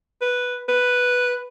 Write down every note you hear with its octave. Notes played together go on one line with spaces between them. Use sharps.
B4
B4